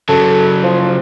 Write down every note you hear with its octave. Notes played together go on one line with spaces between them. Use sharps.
C#3 F#3 A4
F3